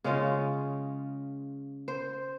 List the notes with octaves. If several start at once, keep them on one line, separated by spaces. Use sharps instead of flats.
C#3 G#3 C#4 F4
C5